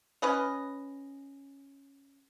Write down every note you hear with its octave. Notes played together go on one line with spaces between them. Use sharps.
C#4 B4 D#5